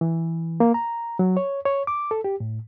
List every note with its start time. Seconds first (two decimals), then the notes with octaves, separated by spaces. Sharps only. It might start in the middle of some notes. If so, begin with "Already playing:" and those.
0.01 E3
0.60 A#3
0.74 A#5
1.19 F#3
1.37 C#5
1.65 C#5
1.87 D6
2.11 A4
2.24 G4
2.40 A2